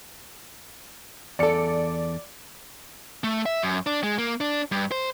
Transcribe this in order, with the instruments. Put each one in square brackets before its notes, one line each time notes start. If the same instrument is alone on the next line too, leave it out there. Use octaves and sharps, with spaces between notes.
[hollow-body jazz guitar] E2 A4 [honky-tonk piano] D5 C#7
[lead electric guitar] A3
E5
F#2
D4
G#3
A#3
D4
G2
C5